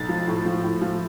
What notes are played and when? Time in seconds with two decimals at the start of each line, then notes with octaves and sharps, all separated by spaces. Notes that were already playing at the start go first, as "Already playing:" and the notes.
Already playing: B1 A6
0.09 F3
0.28 A2
0.46 F3
0.64 A2
0.81 F3